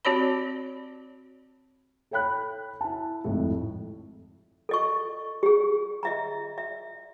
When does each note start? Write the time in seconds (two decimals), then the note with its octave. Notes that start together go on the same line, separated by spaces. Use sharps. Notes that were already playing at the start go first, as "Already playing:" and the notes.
0.05 C4 F#4 G4 C#5 D5 B5
2.11 A4 C#5 G5 B5 F#6
2.81 E4 A5
3.25 G#1 F2 A2
4.69 A4 D#5 C#6
5.43 G4 G#4
6.03 D#5 E5 A#5
6.58 E5